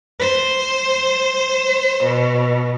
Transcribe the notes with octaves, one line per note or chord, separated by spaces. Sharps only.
C5
B2